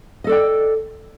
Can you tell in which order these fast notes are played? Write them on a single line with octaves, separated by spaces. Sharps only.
D#5 A4 D5 G5